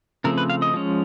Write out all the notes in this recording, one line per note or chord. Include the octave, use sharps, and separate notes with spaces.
C#3 F3 A3 C4 A#4
B4
F5
D#5
F3 G#3 C#4